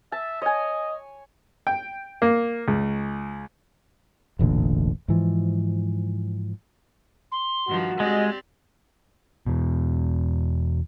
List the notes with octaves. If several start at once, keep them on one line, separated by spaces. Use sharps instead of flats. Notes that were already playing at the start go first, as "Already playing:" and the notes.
E5 A5
C#5 D#5 G#5
G5
A#3
C#2
E1 A1 A#2 D3
G#2 E3 F3
C6
G2 D#3 F3 F#4
G#3 C4 G4 D5 D#5
E2 B2